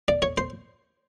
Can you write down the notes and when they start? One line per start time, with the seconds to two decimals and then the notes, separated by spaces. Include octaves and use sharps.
0.08 D5
0.22 C#5
0.38 C5